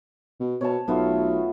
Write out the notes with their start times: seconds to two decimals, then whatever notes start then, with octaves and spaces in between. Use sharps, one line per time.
0.40 B2
0.61 B2 C#5 A5
0.88 B1 A3 B3 F4